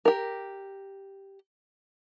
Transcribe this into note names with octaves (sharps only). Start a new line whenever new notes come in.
G4 A#4